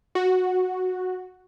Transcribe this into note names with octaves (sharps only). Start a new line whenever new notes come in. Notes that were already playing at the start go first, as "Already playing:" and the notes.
F#4